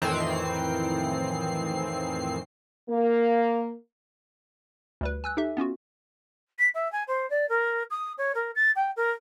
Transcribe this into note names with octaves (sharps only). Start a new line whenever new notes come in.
F2 A2 D#3 E3 C4 C7
A#3
D2 G3 B4
G#5 E6 F#6
D#4 G4 A4 E5
B3 C#4 F4 F#4
B6
E5
G#5
C5
D5
A#4
D#6
C#5
A#4
A6
G5
A#4